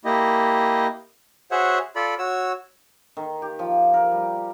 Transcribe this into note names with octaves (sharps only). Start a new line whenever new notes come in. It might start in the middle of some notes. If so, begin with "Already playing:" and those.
A#3 E4 G4 D#5
F#4 G#4 C5 C#5 E5 F#5
F4 A4 D5 B5
F#4 C#5 E6
D#3
G4
F3
A#4
G3